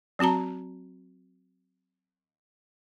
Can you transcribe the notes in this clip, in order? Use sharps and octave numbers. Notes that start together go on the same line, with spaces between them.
F#3 C4 F#4 A5 A#5